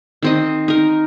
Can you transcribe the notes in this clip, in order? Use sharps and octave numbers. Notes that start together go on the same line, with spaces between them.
D#3 C4 D#5
D#4 A#4